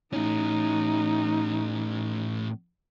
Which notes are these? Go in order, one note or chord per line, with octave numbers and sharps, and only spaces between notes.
A2 C#4 D#4